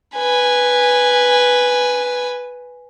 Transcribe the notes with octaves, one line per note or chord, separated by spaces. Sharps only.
B4 G#5